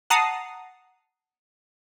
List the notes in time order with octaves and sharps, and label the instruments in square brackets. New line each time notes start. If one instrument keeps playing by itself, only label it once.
[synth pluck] F#5 A5 A#5 D#6 C7